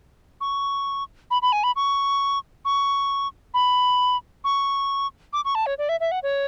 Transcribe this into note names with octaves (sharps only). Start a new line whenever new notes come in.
C#6
B5
B5
G#5
B5
C#6
C#6
B5
C#6
D6
C#6
A5
C#5
D5
E5
E5
F#5
C#5